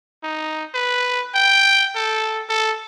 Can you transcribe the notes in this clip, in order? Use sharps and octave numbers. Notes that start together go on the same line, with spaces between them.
D#4
B4
G5
A4
A4